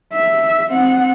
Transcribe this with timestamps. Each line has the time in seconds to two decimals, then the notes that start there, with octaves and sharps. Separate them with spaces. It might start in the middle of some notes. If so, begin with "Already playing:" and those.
0.13 E5
0.69 C4 F#5